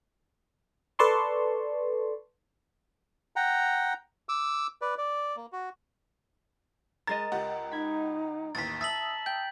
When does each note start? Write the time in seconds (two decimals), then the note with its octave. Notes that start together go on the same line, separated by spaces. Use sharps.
0.99 A4 B4 D5 A5 C6 C#6
3.36 F#5 G5 A#5
4.29 D6 E6
4.82 B4 D5
4.98 D5
5.36 A#3
5.52 F#4
7.07 G#3 A#4 D#5 A#5 A6
7.32 C#2 G4 F#5
7.72 D#4 B5 G#6
8.55 A1 D#2 A6 B6
8.81 E5 A5 D#6 E6 A6 B6 F#7
9.26 G5 G6